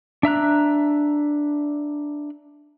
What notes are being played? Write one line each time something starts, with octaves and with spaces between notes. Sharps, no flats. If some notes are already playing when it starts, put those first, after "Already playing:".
D4 E5 A#5 F#6